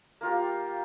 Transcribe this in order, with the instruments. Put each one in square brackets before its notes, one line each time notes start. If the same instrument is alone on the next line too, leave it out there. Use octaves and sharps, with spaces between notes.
[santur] A#3 F4 G4